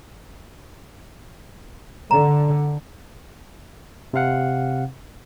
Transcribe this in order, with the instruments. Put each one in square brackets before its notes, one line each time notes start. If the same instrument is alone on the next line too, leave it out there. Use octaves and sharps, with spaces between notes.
[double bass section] D3 [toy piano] A#5
[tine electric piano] C3 C4 F5 F#5